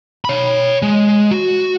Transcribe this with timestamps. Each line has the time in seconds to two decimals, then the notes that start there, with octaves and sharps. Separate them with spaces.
0.25 C#5 B5
0.82 G#3
1.31 F#4